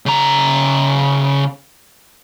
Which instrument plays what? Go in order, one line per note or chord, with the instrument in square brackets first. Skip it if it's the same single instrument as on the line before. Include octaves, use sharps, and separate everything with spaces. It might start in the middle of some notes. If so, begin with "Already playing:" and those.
[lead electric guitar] C#3 A#5